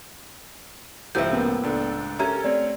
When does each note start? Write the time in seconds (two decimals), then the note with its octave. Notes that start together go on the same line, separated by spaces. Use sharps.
1.15 C#2 A2 F3 C4 G4 C5 E5 G6
1.32 A#3 B3 C#4
1.63 C#2 D4 A4
2.19 C#4 G4 A4 A#4 E5 A#5 G#6
2.44 A3 C4 C#5 D5